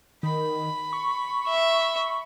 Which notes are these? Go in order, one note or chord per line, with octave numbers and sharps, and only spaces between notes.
D#3 B5
C#6
E5